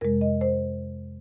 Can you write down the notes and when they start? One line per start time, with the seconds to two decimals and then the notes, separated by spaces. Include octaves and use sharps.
0.01 F2 C3 G#3 A#4
0.21 D#5
0.41 C5